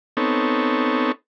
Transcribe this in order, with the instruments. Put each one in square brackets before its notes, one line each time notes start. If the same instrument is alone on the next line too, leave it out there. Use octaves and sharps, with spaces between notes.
[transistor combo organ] B3 C4 D#4 A4 C#5